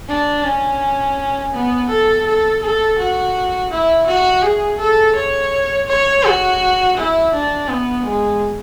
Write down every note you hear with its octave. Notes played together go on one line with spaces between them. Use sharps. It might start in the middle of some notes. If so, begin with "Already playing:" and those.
D4
C#4
B3
A4
A4
A4
F#4
E4
F#4
G#4
A4
C#5
C#5
F#4
E4
D4
B3
G#3